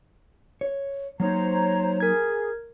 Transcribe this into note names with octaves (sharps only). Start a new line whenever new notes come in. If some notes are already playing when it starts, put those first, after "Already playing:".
C#5
F#3 A#3 D#4 C5 C#5 A#5
G#4 A#4 G#6